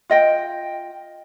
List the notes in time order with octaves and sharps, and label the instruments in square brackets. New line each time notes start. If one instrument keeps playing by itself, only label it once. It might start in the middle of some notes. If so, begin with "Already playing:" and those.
[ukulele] F4 D#5 G5